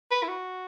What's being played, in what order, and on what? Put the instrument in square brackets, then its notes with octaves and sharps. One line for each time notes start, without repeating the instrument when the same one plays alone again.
[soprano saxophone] B4
E4
F#4